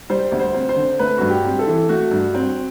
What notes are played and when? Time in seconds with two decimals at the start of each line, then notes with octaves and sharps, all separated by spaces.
0.10 G3 C5
0.32 D2
0.39 C5
0.54 C4
0.69 C5
0.76 D3
0.99 A3 B4
1.18 G2 F#4
1.30 G4
1.44 C4
1.59 A4
1.66 E3
1.89 A3 F#4
2.11 G2
2.34 C4